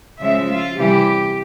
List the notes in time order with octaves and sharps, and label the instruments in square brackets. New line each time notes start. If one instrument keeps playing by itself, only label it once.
[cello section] C#3 F3 G#3 E5
F4
C3 E3 G3 G4